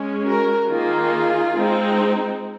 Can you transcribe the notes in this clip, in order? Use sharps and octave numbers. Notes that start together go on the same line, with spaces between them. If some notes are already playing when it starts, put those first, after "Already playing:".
Already playing: G#3 C#4
F#4 A#4
D#3 A#3 D#4 F4 G#4
G#3 C4 D#4